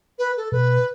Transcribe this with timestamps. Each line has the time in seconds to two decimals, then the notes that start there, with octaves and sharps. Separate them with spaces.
0.19 B4
0.37 A4
0.52 B2 B4